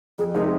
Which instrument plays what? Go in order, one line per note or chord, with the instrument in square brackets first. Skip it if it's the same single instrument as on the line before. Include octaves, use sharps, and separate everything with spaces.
[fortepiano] F2 [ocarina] G#4
[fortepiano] C3 G#3 D#4 A#4 [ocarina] G#4